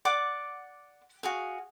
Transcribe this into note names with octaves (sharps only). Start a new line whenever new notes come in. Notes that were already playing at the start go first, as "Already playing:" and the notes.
D5 F#5 D6
F#4 G#4 F5